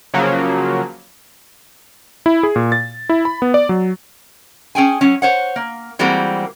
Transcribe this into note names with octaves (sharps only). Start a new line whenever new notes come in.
C#3 F3 F#3 A#3
E4
G#4
A#2
A6
E4
B5
B3
D5
F#3
C#4 G#4 G5 G#5
F#3 C#4
C5 C#5 F#5
A#3
E3 G3 G#3 A#3 C4 F#4